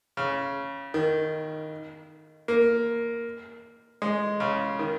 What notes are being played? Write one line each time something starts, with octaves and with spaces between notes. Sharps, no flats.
C#3
D#3
A#3
G#3
C#3
D#3